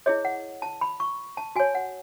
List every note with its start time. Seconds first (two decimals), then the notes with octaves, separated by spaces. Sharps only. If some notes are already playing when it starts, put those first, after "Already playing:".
0.06 E4 G#4 C#5 D#5
0.25 F#5
0.62 A5
0.81 B5
1.00 C#6
1.37 A5
1.56 F#4 C#5 G#5
1.75 F#5